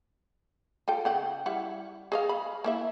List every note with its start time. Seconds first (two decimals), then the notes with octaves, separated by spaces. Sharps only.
0.88 F4 A4 G5
1.05 C#3 F#5 G5
1.46 G3 E4 F#5
2.12 G#4 D#5 F5
2.29 B5
2.64 A#3 E4 E5